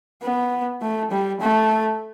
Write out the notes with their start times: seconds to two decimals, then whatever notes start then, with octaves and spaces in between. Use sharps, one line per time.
0.22 B3
0.81 A3
1.11 G3
1.41 A3